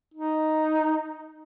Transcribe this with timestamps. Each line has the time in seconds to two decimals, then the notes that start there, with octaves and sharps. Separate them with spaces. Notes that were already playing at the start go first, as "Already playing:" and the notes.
0.14 D#4